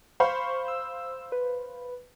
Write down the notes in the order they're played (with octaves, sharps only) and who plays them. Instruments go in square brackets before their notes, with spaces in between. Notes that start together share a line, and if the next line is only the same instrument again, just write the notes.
[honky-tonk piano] C5 F5 B5 [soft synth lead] C#6
[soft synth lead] E6
B4